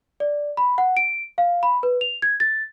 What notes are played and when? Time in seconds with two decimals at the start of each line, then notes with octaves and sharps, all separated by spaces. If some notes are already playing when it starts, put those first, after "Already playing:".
0.20 D5
0.57 B5
0.78 F#5
0.97 D7
1.38 F5
1.63 B5
1.83 B4
2.01 F7
2.22 G#6
2.40 A6